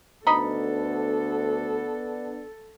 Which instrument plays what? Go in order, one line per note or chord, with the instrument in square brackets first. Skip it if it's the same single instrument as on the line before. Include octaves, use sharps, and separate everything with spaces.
[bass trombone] D2 [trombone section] B3 D4 [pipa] D#4 D#5 B5 [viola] A4